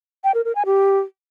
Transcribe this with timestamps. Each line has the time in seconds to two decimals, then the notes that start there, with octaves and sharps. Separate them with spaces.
0.24 G5
0.34 A#4
0.45 A#4
0.55 G#5
0.66 G4